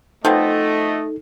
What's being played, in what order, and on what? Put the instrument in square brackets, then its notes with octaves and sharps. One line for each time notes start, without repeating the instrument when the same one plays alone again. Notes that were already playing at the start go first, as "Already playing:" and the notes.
[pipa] F3 B3 C4 [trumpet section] A3 D#5 [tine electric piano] D#4 A4